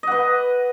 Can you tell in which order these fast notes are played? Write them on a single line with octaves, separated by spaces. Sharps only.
D#5 F#5 B4